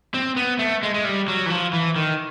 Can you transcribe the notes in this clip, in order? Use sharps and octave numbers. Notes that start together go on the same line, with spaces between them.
C4
B3
A3
G#3
G#3
G3
F#3
E3
F3
E3
D#3